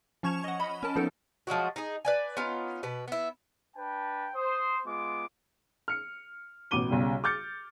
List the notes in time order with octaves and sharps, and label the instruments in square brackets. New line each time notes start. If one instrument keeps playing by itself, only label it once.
[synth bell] F3 C#4 C#6 G#6 E7 F7
D#5 F#5
D#5 B5
C#4 A#4 A5
F3 B3 D#4 A4 A#4
[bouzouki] F3 F#3 G#3 F#4
D#4 G#4
B4 D5 G#5
B3 C#4 D#4 F4
B2 B4
B3 E4
[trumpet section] D4 B4 G5 A5
C5 D#6
G#3 B3 F4 D6
[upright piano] F6 C#7
A1 B2 D6 D#7 G7
B1 C#3 G3
D6 F6 G6 A6 C#7